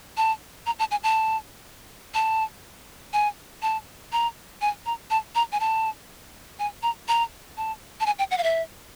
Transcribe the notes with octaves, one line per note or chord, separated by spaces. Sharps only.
A5
A#5
A5
G#5
A5
A5
G#5
A5
A#5
G#5
A#5
A5
A#5
G#5
A5
G#5
A#5
A#5
A5
A5
G#5
G5
F#5
F5
E5